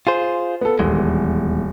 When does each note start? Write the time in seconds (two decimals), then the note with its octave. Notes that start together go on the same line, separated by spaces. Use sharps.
0.07 F4 G#4 C5
0.61 B3 A4
0.79 D#1 E2 G#3